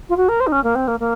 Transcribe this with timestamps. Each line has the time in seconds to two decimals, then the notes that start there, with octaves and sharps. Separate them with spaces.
0.09 F4
0.17 F#4
0.28 A#4
0.40 C5
0.47 D#4
0.52 C#4
0.64 A#3
0.75 C4
0.87 A#3
1.00 A#3